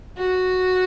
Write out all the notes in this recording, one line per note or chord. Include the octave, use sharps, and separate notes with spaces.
F#4